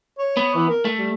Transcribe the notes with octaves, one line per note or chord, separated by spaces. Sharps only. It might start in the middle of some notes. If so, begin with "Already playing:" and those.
C#5
B3
E3
A#4
A3
G3